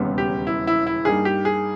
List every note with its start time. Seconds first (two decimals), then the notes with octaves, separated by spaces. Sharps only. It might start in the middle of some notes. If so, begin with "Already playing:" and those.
Already playing: E1 D#2 C#3 G3 B3
0.18 G4
0.47 E4
0.67 E4
0.87 E4
1.05 G2 G3 A#3 D#4 G#4
1.25 G4
1.45 G#4